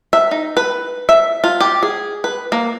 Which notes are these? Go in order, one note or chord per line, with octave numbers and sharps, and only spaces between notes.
E5
D#4
B4
E5
F4
G4
G#4
B4
A#3